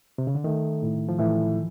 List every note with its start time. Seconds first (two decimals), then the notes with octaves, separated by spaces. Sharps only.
0.18 C3
0.27 C#3
0.35 D3
0.44 D#3 A3
0.82 A2
1.09 F3
1.18 A2 E3